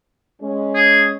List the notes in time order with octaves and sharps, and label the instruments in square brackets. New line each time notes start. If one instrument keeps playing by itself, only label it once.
[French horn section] G#3 C#4
[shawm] G#4